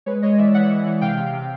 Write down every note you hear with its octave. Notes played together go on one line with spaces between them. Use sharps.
G#3 B4 C#5
G#3 C#5 D#5
E3 D5 E5
E3 E5 F#5
E3
E3
C3 F5 G5
C3
C3